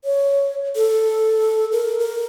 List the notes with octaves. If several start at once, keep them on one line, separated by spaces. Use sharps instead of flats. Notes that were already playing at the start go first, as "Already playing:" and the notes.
C#5
A4
A#4
A#4